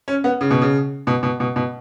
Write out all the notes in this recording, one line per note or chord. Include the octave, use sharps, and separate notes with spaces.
C#4
B3
C#3
B2
C#3
B2
B2
B2
B2